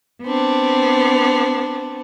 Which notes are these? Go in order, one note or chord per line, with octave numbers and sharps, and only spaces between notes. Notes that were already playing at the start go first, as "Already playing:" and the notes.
B3 C4 D4